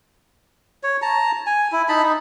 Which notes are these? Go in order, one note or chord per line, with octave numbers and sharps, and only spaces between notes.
C#5
A5 A#5
G#5
E4
D#4 A5 B5
D#4